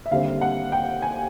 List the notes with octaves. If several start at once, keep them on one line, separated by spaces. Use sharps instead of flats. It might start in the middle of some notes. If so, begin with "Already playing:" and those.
E5
D#2 D3 G3 C4 F5
F#5
G5
G#5